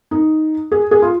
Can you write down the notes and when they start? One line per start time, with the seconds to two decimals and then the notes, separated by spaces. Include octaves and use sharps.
0.11 D#4
0.72 G#4
0.91 G#4
1.02 F4